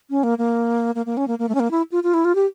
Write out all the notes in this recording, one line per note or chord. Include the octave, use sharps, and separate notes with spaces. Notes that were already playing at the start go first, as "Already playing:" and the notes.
C#4
A#3
A#3
A#3
A#3
C#4
A#3
A#3
A3
C#4
A#3
E4
F4
F4
E4
F4
G4